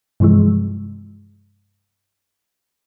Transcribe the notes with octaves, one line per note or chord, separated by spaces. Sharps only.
G2 C3 E3 F3 G#3